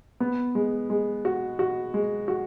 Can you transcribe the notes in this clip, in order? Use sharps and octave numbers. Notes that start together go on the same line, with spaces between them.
B3
G#3
G#3
F#4
F#4
G#3
F#4